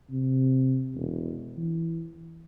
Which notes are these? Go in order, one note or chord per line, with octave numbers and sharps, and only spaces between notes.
C3
E1
E3